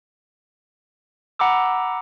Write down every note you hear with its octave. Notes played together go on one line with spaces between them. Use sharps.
F#5 A#5 B5 D6 E6